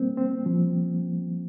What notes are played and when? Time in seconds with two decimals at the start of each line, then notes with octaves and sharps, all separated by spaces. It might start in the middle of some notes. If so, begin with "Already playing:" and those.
Already playing: G3 A#3 C4
0.17 C4
0.46 F3